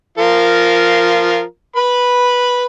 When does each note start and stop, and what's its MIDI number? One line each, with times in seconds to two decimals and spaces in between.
0.18 1.42 53
0.18 1.42 65
0.18 1.42 70
1.76 2.65 71
1.76 2.65 83